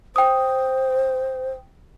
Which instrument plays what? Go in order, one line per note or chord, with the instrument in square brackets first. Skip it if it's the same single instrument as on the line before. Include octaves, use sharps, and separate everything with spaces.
[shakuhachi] C5 [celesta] G5 D#6